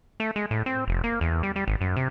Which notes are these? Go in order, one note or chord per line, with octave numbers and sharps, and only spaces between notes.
A3
G#3
A2
C4
F1
A#3
E2
G3
G3
G#1
F#2
C3